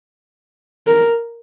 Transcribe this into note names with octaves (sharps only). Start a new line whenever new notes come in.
A#4